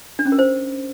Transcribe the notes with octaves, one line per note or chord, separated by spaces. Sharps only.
D4
C#4
A#4
C5